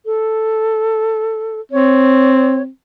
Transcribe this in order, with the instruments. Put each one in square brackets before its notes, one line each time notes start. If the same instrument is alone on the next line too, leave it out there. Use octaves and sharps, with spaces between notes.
[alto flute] A4
[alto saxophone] C4 [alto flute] C#5